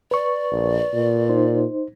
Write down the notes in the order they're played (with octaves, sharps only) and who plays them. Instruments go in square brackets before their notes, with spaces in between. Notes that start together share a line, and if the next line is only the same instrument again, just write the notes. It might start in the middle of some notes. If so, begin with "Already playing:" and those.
[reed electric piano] B4 C#6 [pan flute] D5
[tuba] A#1
A#2
[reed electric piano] D#4 C5